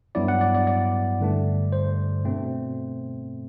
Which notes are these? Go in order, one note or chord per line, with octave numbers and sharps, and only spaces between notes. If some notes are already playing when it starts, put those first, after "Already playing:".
G2 F#3 B3 E4 D5
F#5
D5
D5
D5
G2 D3 A3 D4
C5
B2 A3 C4